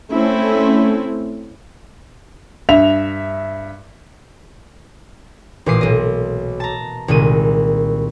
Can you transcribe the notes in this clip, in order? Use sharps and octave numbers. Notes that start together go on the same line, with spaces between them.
A3 C4 C#4 E4 A4
G2 E5 F7
A1 A#2 E3 D6 D#6 C7
B1 D#5
A5 A#5
C2 A#2 D#3 G#3 D#7